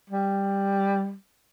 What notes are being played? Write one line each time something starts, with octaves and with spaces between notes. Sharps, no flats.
G3